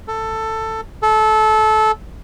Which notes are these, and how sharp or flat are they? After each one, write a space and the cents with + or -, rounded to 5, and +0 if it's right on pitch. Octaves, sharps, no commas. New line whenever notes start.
A4 +10
A4 -20